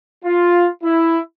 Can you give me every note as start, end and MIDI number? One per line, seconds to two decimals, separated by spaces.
0.24 0.69 65
0.84 1.19 64